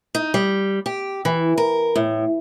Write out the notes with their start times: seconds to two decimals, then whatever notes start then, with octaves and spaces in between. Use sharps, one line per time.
0.15 D#4
0.34 G3
0.86 G4
1.25 E3
1.58 A#4
1.96 A2